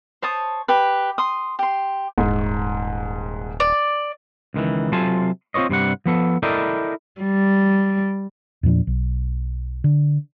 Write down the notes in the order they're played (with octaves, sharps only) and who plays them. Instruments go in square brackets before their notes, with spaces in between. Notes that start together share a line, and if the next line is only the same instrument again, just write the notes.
[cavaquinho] C5 C#5 A5 D#6
G4 B4
C6 D#6
G4 C6
[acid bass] D#1 [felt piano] G#2
[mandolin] D5
[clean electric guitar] C#2 D#3 E3
C3 F#3 F4 A4 G#5 A5
C4 F4 C5 C#5 D#5
G2 C3 G3 F#5
F3 B3 A4
E4 A4 A#4 D5 D#5 G5
[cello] G3
[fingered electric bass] E2 A#2 F3 D4
B1
D3